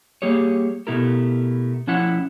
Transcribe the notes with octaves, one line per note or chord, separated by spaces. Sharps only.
G3 A#3 G4 G#4 C#5
B2 A3 B3 E4 G4 A#4
F3 C#4 E4 F#5